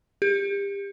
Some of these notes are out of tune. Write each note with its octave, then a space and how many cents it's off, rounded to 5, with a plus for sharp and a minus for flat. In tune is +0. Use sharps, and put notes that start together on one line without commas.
G4 +30